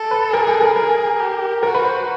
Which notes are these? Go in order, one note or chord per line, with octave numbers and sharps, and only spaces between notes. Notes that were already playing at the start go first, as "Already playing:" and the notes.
Already playing: A4
B4
G#4 A#4
A4
A#4
G#4 A#4
G4
F#4 A#4
B4
C5